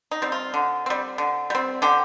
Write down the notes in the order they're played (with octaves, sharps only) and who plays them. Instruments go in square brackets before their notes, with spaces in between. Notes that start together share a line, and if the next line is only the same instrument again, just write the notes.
[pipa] D#4
G3 C4
F4
D3
G3 C4
D3
G3 C4
D3 G4